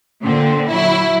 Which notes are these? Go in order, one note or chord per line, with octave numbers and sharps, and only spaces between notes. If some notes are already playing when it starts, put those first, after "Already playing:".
A#2 D3 C4
F#3 E4